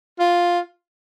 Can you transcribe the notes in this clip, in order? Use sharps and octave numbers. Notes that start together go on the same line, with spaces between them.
F4